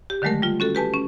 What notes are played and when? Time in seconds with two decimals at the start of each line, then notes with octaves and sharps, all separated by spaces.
0.10 G4
0.22 D3 D#3 F#3 G#3 A3 A#4
0.42 G3 F4
0.60 C#4 F#4 A4
0.75 G4 B4 G#5 A5
0.94 C#4